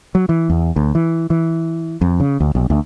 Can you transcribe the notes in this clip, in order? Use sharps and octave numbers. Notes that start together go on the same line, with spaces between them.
F#3
E3
E2
D2
E3
E3
F2
C#3
D2
B1
D2